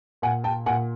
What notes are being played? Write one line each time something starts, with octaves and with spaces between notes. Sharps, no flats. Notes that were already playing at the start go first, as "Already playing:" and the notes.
A#2 F#5 G#5
G5 A5
A#2 F#5 G#5